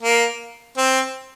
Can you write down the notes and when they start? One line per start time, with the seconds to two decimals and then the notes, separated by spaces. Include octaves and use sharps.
0.02 A#3
0.77 C4